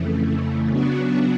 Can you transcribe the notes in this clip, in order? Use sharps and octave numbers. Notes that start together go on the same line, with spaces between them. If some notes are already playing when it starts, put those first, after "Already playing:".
Already playing: F2 C#3 E3 A3
C#3 F#3 B3 D4 F#4